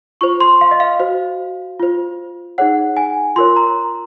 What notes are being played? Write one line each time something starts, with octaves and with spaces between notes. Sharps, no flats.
F4 C5 C#6
C6
F5
D#5
F5
F#4 C5
F4 C5
D#4 G#4 C#5 F#5
G#5
F4 A#4 C#5 C6
A#5